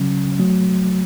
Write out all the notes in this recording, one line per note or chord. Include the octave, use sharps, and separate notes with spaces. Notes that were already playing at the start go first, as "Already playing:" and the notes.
Already playing: C#3 F#3 C#4
F#3 A3